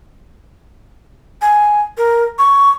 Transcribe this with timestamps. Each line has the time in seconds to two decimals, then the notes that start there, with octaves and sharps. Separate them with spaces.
1.42 G#5
1.97 A#4
2.39 C#6